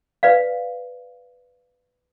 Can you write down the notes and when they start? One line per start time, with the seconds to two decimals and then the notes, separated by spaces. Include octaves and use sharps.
0.23 B4 D5 F5